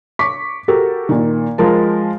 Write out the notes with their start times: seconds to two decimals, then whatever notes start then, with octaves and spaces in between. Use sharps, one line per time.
0.19 C#6 D6 B6
0.68 F#4 G4 A4 A#4
1.09 A#2 D#3
1.58 F3 G#3 A#4 A5